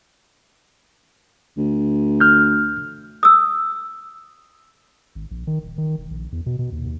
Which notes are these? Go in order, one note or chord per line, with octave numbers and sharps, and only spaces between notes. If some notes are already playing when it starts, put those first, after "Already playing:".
D2
F6 G6
D#6 E6
G#1
A#1
D#3
D#1
D#3
E1
A#1
E2
B2
B2
D#2
D#2